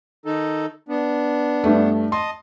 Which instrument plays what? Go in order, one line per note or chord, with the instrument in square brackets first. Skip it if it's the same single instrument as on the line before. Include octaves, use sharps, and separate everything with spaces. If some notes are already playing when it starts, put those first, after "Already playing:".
[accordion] D#3 D#4 A4
B3 D4
[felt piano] G2 A3
[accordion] D#5 A5 D#6 [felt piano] C6